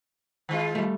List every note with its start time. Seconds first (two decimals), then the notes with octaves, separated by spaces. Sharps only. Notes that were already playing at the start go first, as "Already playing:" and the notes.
0.49 D#3 G#3 F4
0.75 G3 A3